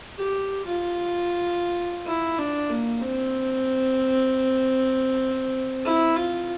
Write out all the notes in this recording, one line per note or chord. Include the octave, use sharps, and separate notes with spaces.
G4
F4
E4
D4
A#3
C4
E4
F4